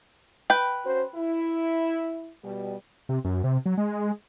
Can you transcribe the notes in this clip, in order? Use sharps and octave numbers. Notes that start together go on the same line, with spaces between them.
B4 G5
C#4 F#4 C5
E4
B2 G3
C3
F#2
C3
F#3
G#3